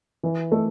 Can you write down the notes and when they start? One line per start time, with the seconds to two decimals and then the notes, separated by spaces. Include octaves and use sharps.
0.23 E3
0.52 A3